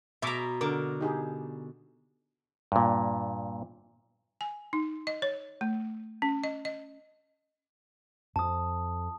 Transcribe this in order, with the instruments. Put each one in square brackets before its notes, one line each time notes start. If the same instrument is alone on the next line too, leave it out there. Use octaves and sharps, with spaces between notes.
[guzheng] B2 A#5 [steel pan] E5 C#6 D6
[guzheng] D3 [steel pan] A#4 D6
[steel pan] D#4 G4 G#4
[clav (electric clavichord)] G2 A#2
[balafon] G#5
D#4
D#5
C#5
A3
C#4
D#5
D#5
[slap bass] F2 [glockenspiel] A5 D#6